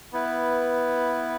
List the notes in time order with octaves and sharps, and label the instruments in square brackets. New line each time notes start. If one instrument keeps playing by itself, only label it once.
[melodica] B3 E4 B4